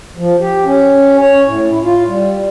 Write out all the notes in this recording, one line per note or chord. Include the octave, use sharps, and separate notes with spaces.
F3
G4
C#4
C#5
A2
E4
F4
G3